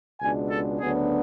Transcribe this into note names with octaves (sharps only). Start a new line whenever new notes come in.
C#2 B2 G#3 D4 G#5
A4
D2 C#3 F#3 B3 D4 G#4